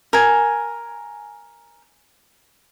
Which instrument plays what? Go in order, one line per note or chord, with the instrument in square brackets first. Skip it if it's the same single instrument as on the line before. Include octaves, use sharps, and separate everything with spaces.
[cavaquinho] A#4 G#5